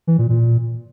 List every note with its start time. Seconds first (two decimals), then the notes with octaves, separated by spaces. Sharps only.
0.07 E3
0.18 A#2
0.29 A#2